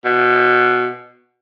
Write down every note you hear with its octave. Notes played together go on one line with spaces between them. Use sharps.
B2